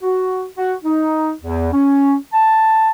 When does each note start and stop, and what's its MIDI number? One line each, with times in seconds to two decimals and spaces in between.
0.03 0.43 66
0.58 0.73 66
0.84 1.31 63
1.41 1.68 40
1.72 2.15 61
2.33 2.91 81